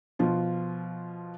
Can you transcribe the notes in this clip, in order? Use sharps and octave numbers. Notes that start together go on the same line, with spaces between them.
B2 F3 F4